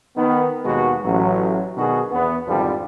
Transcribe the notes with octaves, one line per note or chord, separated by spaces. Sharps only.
D#3 B3
D#2 B2 G#3 F#4
A1 F#3
B2 D#3 D4 F#4 G#4
E2 B3
G#1 F2 D3 F3 G3